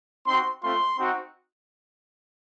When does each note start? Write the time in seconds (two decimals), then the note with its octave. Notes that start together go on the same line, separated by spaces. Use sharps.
0.26 C4 D#4 F#4 C6
0.62 A3 C4 F4 C6
0.98 C4 D#4 F#4